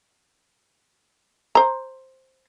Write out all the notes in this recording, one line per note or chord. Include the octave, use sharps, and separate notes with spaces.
C5 A#5